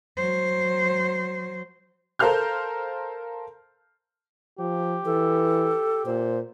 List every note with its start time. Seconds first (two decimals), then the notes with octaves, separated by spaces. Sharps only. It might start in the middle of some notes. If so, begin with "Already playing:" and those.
0.17 F#3 C5
2.19 A4 A#4 C5 F5 F6 G6
4.59 F3 G4
5.05 E3 A4
6.06 A#2 C5